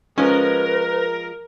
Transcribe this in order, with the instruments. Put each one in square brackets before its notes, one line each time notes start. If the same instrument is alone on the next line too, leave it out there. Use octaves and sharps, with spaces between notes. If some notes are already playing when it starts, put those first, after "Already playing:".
[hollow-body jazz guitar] F3 G#3 [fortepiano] C#4 [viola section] A#4 [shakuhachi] B4